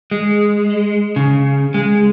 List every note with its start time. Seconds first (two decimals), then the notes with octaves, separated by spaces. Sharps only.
0.11 G#3
1.16 C#3
1.74 G#3